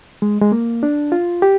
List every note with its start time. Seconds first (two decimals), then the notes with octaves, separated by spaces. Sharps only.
0.22 G#3
0.41 G#3
0.52 A#3
0.83 D4
1.12 F4
1.42 G4